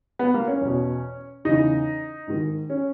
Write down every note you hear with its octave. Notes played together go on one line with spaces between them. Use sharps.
B3
A#3
C#4
E2 B2
E2 C#3 E3 D#4
G#2 D#3
C#4